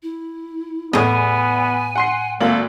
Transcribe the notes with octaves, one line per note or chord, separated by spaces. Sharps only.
E4
E2 A2 B3 D#5 G#5
F#5 C6 C7
G#1 A3 A#3 F5 F#7